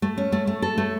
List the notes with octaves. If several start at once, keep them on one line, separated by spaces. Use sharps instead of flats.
A3
C#4
A3
A3
A4
A3